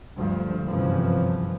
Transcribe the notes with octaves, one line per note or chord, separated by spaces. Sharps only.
D2 G2 F3
G1 C2 F#2 C#3 E3 F3